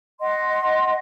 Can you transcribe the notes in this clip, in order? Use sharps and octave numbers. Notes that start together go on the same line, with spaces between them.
D#5 F#5 C6